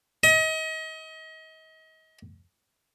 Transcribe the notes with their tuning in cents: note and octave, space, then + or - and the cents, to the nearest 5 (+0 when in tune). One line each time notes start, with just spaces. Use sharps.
D#5 +35